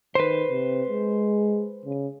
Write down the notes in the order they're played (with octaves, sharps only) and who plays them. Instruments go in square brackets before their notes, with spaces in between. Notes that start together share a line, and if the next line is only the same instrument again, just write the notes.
[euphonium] D#3 [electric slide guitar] B4 C5
[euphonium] C3
G#3
C#3